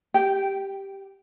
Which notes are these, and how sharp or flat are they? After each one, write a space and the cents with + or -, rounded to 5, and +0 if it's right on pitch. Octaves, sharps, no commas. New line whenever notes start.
G4 +0 G5 -15